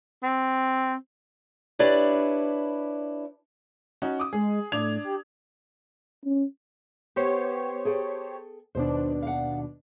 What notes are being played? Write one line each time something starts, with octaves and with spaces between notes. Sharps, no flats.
C4
D4 E4 G4 B4 C#5 D5
C#4 D#4 F#4
D6 D#6
G#3 G#4
A2 D4 G#6 F7
G4
C#4
B3 G4 C5 C#5
G#4 A4 G5
D#2 B2 D4 C5
F5 F#5